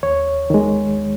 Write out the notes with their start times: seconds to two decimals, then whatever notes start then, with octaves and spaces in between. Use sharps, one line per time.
0.03 D#2 C#5
0.50 D#3 G#3